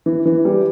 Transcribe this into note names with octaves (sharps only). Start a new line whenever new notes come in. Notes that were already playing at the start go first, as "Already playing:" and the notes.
E3
E3
G3